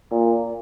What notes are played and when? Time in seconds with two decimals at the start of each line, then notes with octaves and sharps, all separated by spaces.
0.11 A#2